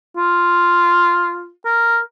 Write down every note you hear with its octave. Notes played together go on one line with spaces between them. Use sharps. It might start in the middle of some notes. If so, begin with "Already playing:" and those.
F4
A#4